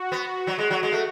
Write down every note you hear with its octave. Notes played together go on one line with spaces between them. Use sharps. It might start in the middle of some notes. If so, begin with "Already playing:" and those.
Already playing: F#4
B3
F#3
G#3
F#3
G#3
A3